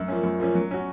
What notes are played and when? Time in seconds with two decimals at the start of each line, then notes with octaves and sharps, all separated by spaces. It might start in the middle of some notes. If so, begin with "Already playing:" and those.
Already playing: F#2
0.08 F3 A#3 C#4
0.23 F#2
0.40 F3 A#3 C#4
0.55 F#3
0.71 C#4 F#4